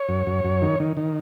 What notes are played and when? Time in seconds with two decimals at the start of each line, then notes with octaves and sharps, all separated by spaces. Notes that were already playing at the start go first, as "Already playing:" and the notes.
Already playing: C#5
0.09 F#2
0.27 F#2
0.45 F#2
0.62 D#3
0.80 D#3
0.97 D#3